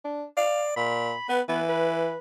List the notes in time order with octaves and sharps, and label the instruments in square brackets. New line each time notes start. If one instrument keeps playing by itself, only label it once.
[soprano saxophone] D4
[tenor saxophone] D5 [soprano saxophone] F5
[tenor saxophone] A#2 [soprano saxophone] B5
[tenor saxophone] B3 [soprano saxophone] B4
[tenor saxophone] E3 [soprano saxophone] B3
[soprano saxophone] B4